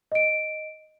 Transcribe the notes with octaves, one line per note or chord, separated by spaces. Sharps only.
D#5 D7